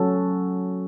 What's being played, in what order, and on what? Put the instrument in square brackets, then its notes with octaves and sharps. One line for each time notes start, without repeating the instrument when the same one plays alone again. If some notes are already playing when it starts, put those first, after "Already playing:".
Already playing: [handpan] F#3 C#4 F#4 A4